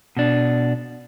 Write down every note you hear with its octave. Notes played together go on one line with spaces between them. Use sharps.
B2 D4